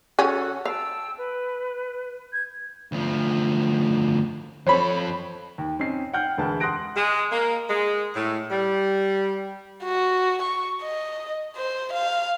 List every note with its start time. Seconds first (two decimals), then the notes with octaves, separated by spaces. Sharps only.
0.19 C#3 C#4 F#4 A4 G#5
0.65 F5 G5 A5 E6
1.18 B4
2.32 G6 G#6
2.92 D2 F3
4.67 F2 A4 C5 C#5 B5
5.58 D#2
5.79 C4 C#4 D#4 C7
6.13 F#5 G5 F6 G6
6.37 E1 D2 G#3 B4 A5
6.60 F#5 C6 D#6 F#6 A#6 D7
6.95 G#3
7.32 A#3
7.69 G#3
8.15 A2
8.51 G3
9.84 F#4
10.42 C#6
10.82 D#5
11.57 C5
11.93 F5